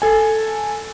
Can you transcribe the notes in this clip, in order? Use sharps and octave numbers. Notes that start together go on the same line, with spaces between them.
A4 G#5